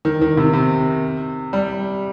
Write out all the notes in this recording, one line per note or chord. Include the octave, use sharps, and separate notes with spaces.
D#3
D#3
C3
C3
G3